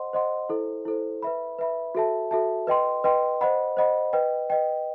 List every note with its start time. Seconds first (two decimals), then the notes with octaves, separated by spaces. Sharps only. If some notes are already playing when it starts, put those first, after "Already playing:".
Already playing: C5 D#5 F#5 C6
0.13 C5 D#5 F#5 C6
0.49 E4 A4 C5
0.85 E4 A4 C5
1.22 B4 E5 B5
1.59 B4 E5 B5
1.95 F#4 A4 E5 A5
2.31 F#4 A4 E5 A5
2.67 B4 D#5 G5 C6
3.04 B4 D#5 G5 C6
3.41 C5 D#5 F#5 B5
3.77 C5 D#5 F#5 B5
4.13 B4 D#5 G5
4.50 B4 D#5 G5